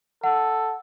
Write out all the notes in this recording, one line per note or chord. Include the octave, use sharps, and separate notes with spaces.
A4 F#5